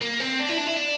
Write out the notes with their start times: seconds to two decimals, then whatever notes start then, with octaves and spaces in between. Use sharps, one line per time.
0.01 A#3
0.20 C4
0.40 D4
0.49 E4
0.58 D4
0.67 E4
0.76 D4